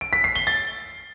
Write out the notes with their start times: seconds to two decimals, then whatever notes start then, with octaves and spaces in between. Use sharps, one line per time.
0.01 D7
0.13 B6
0.24 C7
0.36 G7
0.47 A6